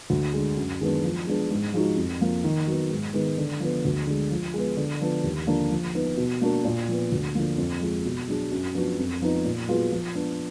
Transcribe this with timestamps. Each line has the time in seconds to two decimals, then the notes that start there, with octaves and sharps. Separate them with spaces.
0.10 D2
0.33 D3 G#3
0.57 F#2
0.81 D#3 G#3 B3 D4
1.04 F3
1.27 G#3 B3 D4 G#4
1.50 G#2
1.74 F3 G#3 D#4 F#4
1.97 F2
2.21 F3 A#3
2.44 D#3
2.67 F#3 B3
2.91 G#2
3.14 D#3 G#3 B3
3.38 D3
3.60 F3 B3
3.85 D2
4.07 D3 G#3
4.31 F3
4.54 G#3 B3
4.77 D3
5.01 F3 B3 D4
5.24 D#2
5.47 D3 F3 A#3 D4
5.71 F3
5.95 B3 D#4
6.17 B2
6.41 A#3 D4 F#4 A#4
6.65 A#2
6.88 F3 B3
7.12 D2
7.35 D3 F3 A#3
7.58 F2
7.81 F3 G#3
8.05 B2
8.28 F#3 D4 G#4
8.52 F#2
8.75 F3 B3 D4 F#4
8.98 F2
9.22 F3 B3 D#4
9.45 A#2
9.68 F#3 B3 F4 G#4
9.91 F3
10.15 B3 D4